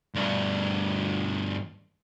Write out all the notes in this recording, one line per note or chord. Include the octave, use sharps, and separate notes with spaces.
D2 G2